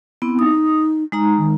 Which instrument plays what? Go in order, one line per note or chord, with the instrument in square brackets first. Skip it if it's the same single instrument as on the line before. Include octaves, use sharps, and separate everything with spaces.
[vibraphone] B3 C4 E4
[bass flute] D#4 [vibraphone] D#6
[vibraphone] G#3 D#4 A#5
[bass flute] D#3